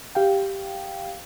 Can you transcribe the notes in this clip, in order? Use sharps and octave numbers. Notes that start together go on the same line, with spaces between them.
G4 F5 G5